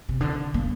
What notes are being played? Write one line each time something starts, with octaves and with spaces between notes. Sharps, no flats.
C3
D3
A#3